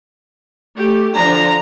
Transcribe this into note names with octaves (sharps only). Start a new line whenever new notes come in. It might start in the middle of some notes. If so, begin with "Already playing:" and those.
A3 G4
D3 F3 D4 A#5